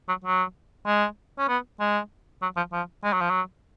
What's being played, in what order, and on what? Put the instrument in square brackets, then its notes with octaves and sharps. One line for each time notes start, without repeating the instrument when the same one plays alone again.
[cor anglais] F#3
F#3
G#3
C#4
B3
G#3
F#3
F3
F3
G#3
F#3
F3
F#3